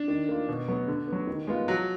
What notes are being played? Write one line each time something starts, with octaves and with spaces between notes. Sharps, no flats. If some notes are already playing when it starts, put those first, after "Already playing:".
Already playing: D4
D#3
A#3 F4
B2
F#3 B3
D3
F#3 B3
D#3
G#3 B3 F4
F3 F#3